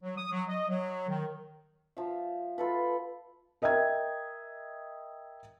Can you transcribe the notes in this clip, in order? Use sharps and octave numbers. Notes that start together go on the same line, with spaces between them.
F#3
D#6
F#3
D#5
F#3
D#3
F3 E5
F4 A4 B4
A#4 D#5 E5 G5 G#6